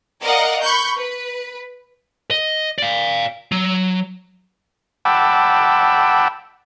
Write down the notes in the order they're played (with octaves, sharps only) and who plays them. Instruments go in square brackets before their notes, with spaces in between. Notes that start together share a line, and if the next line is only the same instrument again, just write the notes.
[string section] A#4 D5 D#5 F5 F#5
B5 C#6 F#6 G6
B4
[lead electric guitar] D#5
D5 F5
F#3
[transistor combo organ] F#5 G5 A5 B5 D6 E6